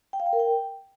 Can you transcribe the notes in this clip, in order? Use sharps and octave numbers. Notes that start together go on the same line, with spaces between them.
G5
F5
G5
A#4
G5